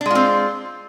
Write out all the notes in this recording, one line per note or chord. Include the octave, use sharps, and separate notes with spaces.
G#3 C4 D4 F4